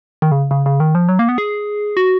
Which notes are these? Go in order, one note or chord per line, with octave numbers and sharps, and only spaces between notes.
D#3
C#3
C#3
C#3
D#3
F3
F#3
A#3
B3
G#4
F#4